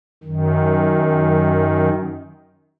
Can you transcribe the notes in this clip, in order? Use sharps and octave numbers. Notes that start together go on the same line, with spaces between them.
F#2 D#3